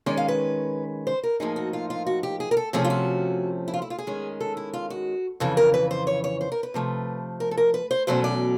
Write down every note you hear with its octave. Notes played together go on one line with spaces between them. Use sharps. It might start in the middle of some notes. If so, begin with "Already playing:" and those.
D#3 G#3 C#4 D5
F5
B4
C5
A#4
A2 F3 A#3 D#4 G#4
F#4
F4
F4
F#4
G4
G#4
A#4
A4
C3 F3 A3 C#4 G#4
F4
F#4
E4
F4
E4
F4
G#4
D#3 G#3 C#4
A4
E4
F4
F#4
F2 C#3 E3 A4
A#4
B4
C5
C#5
C#5
C5
A#4
B4
C3 F3 A3
A#4
A4
A#4
B4
C5
E2 B2 F#3 A3 C#4 C5
D5